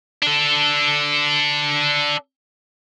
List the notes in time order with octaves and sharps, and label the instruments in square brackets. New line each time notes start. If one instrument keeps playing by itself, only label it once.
[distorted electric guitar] D4 A4